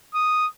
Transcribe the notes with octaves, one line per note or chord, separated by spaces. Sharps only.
D#6